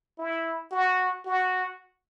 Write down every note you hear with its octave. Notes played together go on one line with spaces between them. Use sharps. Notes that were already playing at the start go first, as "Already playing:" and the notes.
E4
F#4
F#4